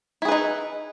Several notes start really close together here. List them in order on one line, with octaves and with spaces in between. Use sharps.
E4 G#4 B4 D#4